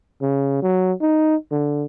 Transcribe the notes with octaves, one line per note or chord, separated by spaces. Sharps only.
C#3
F#3
D#4
D3